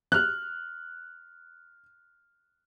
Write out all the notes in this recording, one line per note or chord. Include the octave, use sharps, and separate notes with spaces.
F6 F#6